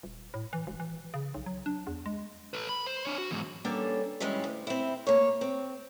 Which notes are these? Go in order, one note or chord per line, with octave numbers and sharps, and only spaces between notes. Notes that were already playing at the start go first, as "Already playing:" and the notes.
D#1
A2
E3
E1
E3
C#3
B1
F#3
D4
E2
G#3
A4 B4
B5
C5
D4 C#5
F#4
E2 G#2
G3 A#3 B3 C#4 D4 A4
A#2 E3 G3 G#3 C#4
D2
C4 E4
A#3 C#5
C4